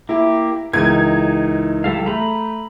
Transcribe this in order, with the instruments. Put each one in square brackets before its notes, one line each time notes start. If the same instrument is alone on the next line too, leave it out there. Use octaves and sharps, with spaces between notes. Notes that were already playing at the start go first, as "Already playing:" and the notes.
[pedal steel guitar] A#3 G4 [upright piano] E4
[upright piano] C#2 E3 G#6 [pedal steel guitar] D#4 A#4 G6
[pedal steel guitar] G3 A4 F5
[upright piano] A3 [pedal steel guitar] A#5 B5